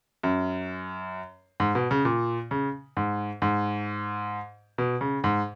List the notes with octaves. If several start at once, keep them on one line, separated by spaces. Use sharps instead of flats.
F#2
G#2
B2
C#3
A#2
C#3
G#2
G#2
B2
C#3
G#2